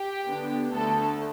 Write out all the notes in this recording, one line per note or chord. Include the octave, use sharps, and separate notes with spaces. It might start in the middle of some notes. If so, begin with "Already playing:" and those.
Already playing: G4
D3 B3 D4
D2 D3 A3 A4